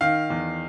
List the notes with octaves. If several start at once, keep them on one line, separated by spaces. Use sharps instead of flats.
D#3 F5
E2